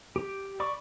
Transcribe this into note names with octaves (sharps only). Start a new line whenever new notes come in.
G4
D5 B5 C#6 D6